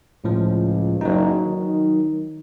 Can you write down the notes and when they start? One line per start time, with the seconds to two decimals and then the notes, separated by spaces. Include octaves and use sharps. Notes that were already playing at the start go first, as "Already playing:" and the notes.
0.24 C#2 A2 F3
1.01 F#1 F#3 D#4
1.45 D#3